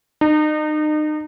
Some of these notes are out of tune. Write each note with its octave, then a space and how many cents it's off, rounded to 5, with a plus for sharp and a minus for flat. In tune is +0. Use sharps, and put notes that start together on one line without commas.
D#4 -35